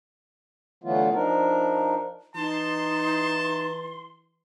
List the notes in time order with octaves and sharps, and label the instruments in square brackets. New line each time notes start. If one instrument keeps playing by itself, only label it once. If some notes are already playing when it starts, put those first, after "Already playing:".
[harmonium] D3 E3 F#3 A3 B3 F4
F3 D4 D#4 A#4
[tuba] E3 [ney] D#4 [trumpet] A5 [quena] C6